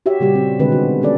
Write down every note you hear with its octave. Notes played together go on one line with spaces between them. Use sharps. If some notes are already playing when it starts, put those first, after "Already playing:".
F#4 G4 C#5 E5
A#2 C#3 G3 G4
C4
B2 D3 D#3 G#3 C4 B4
F#4
G#3 A3 C#4 A4 D5